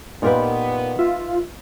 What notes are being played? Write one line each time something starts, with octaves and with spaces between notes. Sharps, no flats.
A#2 B3 D#4 F4 G4 A#4 B4
F4 E5